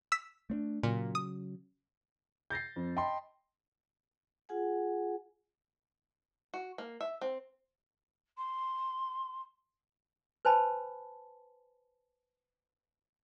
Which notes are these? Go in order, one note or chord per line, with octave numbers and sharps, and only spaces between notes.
E6 B6
A3 C4 D4
A#2 C#3 F#3
D#6
G6 A6 A#6 C7
F2
D#5 G5 A5 B5 C6
F4 G#4 F#5 G#5
F#4
A#3
E5
C4
C6
B4 C5 G#5 A5 B5